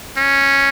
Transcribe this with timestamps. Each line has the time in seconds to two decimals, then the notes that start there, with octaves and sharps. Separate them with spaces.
0.17 C#4